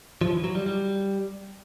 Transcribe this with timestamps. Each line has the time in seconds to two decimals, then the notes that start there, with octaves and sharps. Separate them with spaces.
0.21 F3
0.33 E3
0.44 F#3
0.55 G3
0.66 G3